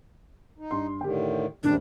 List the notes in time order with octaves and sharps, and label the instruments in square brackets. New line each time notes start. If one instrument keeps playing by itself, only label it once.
[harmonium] D#4
[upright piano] G2 C6
[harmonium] A2 D3 D#3 [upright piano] G4 G5
[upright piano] E1 D#2 C#4 [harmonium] G#2 C3 G3 [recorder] D4